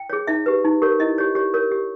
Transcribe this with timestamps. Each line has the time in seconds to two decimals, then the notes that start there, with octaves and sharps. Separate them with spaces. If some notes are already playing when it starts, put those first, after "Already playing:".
Already playing: G5
0.10 G#4 C#5
0.27 D#4 E5
0.46 G4 B4
0.65 D#4
0.82 G4 A#4 C#5
1.00 E4 D#5
1.18 G4 C#5
1.35 G4 C#5
1.54 A#4 C#5
1.71 G4